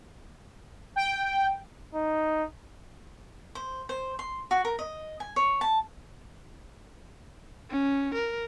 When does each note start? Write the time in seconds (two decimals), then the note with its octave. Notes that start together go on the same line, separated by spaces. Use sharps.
0.96 G5
1.95 D#4
3.55 C5
3.89 C5
4.19 C6
4.51 F#4
4.65 A#4
4.79 D#5
5.20 G#5
5.36 C#5
5.61 A5
7.70 C#4
8.15 A#4